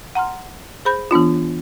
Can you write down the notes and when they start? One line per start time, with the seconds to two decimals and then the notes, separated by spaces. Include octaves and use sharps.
0.15 F#5 A#5 C6 F6
0.85 G#4 C5 B5 G6
1.11 E3 B3 D4 F4